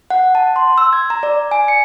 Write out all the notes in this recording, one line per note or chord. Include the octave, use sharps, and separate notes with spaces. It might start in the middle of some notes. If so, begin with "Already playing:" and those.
F#5
A5
C6
E6
G#6
A#5
D5
G#5
C#7